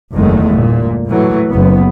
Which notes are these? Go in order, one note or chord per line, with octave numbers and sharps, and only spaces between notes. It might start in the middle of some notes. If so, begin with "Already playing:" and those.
F#1 E2 D#3 G#3 A3
G1 A#2
A2 E3 F#3 A3
F#1 B3